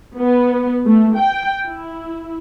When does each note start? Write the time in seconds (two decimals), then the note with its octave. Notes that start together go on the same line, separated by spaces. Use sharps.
0.19 B3
0.86 A3
1.18 G5
1.65 E4